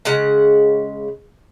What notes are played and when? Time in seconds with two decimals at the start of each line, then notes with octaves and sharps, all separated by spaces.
0.05 C#3 G#3 F#5